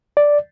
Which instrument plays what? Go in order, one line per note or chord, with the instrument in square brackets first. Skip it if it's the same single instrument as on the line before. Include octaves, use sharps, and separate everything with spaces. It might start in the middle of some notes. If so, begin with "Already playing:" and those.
[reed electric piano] D5